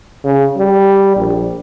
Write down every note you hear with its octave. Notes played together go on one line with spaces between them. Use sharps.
C#3
G3
A#1